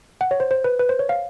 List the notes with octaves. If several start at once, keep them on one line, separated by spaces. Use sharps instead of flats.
F#5
C#5
C5
C5
B4
B4
C5
C#5
F5